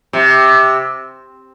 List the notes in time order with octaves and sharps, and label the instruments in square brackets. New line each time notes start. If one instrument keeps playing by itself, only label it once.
[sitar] C3